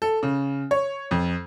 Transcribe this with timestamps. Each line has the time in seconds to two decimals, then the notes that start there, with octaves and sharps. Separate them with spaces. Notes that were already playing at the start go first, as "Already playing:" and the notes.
0.02 A4
0.23 C#3
0.71 C#5
1.11 F2